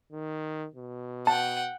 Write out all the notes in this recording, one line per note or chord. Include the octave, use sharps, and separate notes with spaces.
D#3
B2
F#5 G5 A5